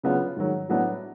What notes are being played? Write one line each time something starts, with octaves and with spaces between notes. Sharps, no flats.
C#3 F#3 B3 D4 F4
G#2 D#3 F#3
A2 F#3 B3 D4